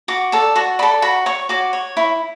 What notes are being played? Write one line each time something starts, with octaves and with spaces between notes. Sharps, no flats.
F#4 D6
A4 D5
F#4 C#6
A4 D5 B5
F#4 B5
C#5 C#6
F#4 D6
C#5
E4